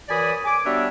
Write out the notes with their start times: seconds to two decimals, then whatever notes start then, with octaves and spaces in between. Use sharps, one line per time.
0.09 F#2 E3 D5 G#5 B5 D#6
0.44 G#5 D6
0.65 G3 B3 D4 F#4 C#5 E5